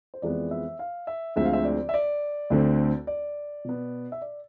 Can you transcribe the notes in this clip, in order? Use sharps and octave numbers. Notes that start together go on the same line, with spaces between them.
C5
F2 E3 G#3 B3 D5
E5
F5
E5
D2 D3 F3 G#3 C4 E5
F5
E5
D5
E5
D5
D2 D3 A3 C4
D5
B2 B3
E5
D5